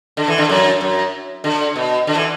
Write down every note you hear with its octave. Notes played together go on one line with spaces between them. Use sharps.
D3
E3
D3
F#2
F#2
D3
B2
D3
E3